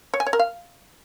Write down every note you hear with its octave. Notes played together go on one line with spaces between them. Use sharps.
C#5
G#5
C#5
A#4
F5